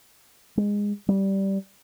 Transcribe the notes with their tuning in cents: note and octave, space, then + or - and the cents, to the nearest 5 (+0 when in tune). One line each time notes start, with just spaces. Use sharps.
G#3 -15
G3 -10